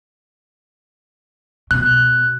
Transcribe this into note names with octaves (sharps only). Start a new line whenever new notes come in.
B2 F#6